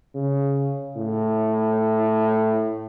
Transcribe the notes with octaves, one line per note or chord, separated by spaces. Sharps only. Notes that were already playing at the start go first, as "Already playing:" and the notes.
C#3
A2